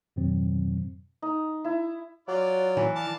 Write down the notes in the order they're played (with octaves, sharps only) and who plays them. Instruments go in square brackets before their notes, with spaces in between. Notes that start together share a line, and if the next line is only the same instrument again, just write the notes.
[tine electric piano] F2 G#2 B2 D#3 F#3 C4
[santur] D#4
E4
[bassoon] F#3 [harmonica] F4 D5
[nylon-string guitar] E3
[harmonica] D5 F5 A5